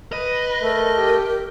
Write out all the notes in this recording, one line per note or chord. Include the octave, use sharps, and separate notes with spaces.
B4 D#5
A3 A#4
G4